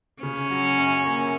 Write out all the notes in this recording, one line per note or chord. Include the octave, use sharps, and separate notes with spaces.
C#3 C#4
F#3
F#2
A#3